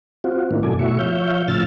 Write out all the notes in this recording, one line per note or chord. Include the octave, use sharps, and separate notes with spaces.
C4 F4 F#4
A2 D#3 A#3 D4 E4
F#2 B2 F#3 A4 D5 G#5
B2 A3 E4 F#4 E5 C#6
F3 C#5 E5 F5 G6
A2 C#3 F3 E6 F6 A6